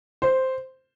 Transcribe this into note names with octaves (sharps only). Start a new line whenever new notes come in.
C5